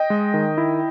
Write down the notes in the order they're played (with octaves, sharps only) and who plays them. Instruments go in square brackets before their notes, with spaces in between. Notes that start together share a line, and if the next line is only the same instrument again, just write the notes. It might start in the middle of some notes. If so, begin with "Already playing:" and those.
Already playing: [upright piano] D#5 G5
[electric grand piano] G#3
D#3
E4